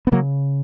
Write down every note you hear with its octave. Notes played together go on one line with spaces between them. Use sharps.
B3
C#3 F#3 A#3